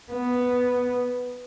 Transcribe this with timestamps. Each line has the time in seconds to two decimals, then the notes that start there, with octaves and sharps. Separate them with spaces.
0.12 B3